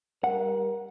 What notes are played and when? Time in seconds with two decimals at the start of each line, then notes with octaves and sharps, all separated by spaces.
0.24 G3 A#4 F#5